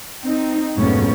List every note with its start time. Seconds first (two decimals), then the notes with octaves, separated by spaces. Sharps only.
0.23 C4 D#4
0.75 F2 G#2 B2 F#3 A3 C#4